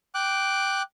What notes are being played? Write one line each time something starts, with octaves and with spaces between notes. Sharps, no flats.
G5 D6 F#6